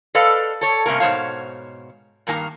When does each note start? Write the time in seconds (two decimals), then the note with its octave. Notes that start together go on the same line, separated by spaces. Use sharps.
0.15 A4 B4 D5 D#5 F5
0.61 A4 C#5
0.86 G2 C3 A3 A#3 C#4 A#4
1.00 G#2 B2 G#3 C5 C#5 F5
2.27 G2 D#3 A#3 G#5 A#5